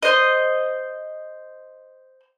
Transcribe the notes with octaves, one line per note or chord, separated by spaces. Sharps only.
C5 D#5